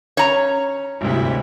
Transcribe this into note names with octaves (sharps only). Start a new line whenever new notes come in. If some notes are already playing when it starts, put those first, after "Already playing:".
C#4 C#5 A#5
G#1 D2 G2 C3 E4